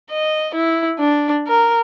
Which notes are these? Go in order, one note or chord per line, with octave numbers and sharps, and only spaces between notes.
D#5
E4
D4
A#4